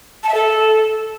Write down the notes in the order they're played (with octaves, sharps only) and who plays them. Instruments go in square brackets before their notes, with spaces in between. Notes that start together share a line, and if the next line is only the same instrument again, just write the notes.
[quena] A5
E5
A4